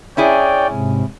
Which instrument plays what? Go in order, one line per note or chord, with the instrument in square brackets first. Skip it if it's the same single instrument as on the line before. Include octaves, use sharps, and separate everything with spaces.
[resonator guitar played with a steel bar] C#4 E4 G#4 [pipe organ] C#5 D5 G5
[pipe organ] G#2 C3